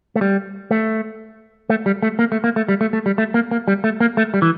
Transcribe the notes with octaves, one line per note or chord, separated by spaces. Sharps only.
A3
G3
A3
A3
G3
A3
A#3
A3
A#3
A3
G3
A3
A3
G3
A3
A#3
A#3
G3
A3
A#3
A3
G3
E3